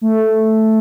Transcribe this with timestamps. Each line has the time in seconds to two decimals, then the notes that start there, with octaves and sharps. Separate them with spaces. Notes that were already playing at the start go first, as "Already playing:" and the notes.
0.01 A3